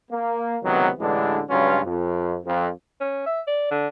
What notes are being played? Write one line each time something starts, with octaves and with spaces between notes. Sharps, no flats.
A#3
C#2 C3 D#3 F#3 B3
A1 D3 E3 G#3 D4
C#2 G2 F#3 C#4 F4
F2
F2
C#4
E5
D5
D3